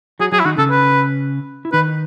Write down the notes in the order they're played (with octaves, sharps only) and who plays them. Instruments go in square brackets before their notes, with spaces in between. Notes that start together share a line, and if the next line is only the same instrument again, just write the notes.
[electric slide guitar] F#3 F#4 [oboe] G#4
[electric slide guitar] F#3 F#4 [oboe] G#4
[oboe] E4
[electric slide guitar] D#3 D#4 [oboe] F#4
[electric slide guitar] C#3 C#4 [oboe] A4
[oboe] B4
[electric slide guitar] E4
[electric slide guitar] D#3 D#4 [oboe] B4